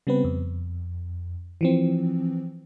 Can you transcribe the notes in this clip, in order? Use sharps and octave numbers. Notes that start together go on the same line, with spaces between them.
C#3 G3 B3 C4 B4
F2
E3 F3 C4